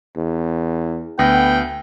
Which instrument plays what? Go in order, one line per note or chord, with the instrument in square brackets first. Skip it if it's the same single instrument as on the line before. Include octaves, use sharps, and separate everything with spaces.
[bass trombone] E2
[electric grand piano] D2 A#6 [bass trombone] B3 [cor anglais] G5